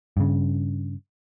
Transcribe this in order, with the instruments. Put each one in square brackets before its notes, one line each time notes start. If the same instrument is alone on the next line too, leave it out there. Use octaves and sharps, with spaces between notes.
[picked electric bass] G2 C#3